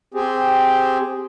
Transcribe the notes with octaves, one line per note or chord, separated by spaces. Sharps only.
C4 G4 G#4